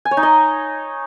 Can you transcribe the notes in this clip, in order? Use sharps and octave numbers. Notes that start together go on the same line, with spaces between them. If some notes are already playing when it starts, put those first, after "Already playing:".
G#5
C#5
D#4
D#5